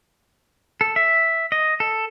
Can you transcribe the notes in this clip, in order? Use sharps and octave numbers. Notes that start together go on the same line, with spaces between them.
A4
E5
D#5
A4